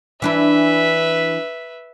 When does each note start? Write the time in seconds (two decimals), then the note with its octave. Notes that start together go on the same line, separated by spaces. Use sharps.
0.22 E3 D4 E4 B4 E5